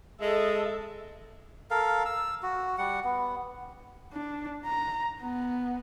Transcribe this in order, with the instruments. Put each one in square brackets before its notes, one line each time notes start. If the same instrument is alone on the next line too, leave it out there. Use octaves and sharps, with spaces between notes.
[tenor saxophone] G#3 [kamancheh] A4 E5 [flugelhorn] D#5
[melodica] A4 A#4 F5
E6
F#4
G3 F#5
B3
[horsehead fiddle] D4
A#5
B3